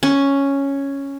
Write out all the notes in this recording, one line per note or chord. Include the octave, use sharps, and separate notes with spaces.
C#4